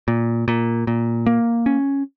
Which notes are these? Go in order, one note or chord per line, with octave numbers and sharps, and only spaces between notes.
A#2
A#2
A#2
A#3
C#4